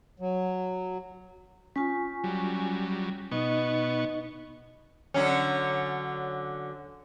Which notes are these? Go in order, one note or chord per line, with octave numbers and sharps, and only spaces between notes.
F#3
C#4 F4 G#5 C#6 B6
F#3 G3
B2 B3 D#4 D#5 C#6
D3 F#3 C#4